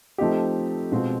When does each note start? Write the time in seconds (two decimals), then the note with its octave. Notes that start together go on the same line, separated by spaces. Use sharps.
0.18 F3 A3 C4 D#4 G4
0.92 B2 G#3 C4 F4